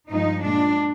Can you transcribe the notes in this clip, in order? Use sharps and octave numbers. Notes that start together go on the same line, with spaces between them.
G2 F3 G#3 D#4
A#2 G#3 D4